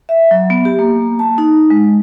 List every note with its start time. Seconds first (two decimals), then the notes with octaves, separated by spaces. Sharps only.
0.09 E5
0.31 F#3
0.50 B3
0.65 G4
0.79 A#3
1.19 A5
1.38 D#4
1.70 G#3